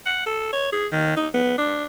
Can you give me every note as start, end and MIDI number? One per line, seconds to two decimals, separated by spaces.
0.06 0.24 78
0.26 0.50 69
0.53 0.69 73
0.72 0.87 68
0.92 1.16 51
1.16 1.28 63
1.34 1.53 59
1.58 1.85 62